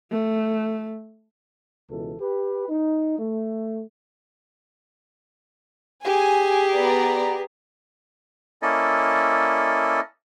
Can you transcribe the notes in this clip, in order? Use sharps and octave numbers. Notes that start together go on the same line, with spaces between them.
A3
C#2 B2 E3 A4
G4 B4
D#4
A3
G4 G#4 G#5
B3 D5 A#5
A#3 C#4 E4 A4 D5 D#5